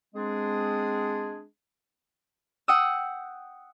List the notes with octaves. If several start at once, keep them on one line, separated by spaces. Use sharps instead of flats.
G#3 C4 D4 G#4
F#5 G5 D#6 E6